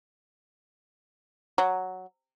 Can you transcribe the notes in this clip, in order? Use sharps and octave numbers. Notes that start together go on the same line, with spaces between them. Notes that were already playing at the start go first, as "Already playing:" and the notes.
F#3